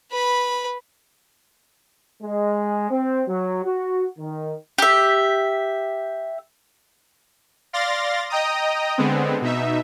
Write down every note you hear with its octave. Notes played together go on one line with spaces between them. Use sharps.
B4 B5
G#3
C4
F#3
F#4
D#3
G4 E5
D5 F5 C6 A6 A#6
D#5 G5 A#5 D#6
D3 G#3 B3 C4
B2 D#4 E5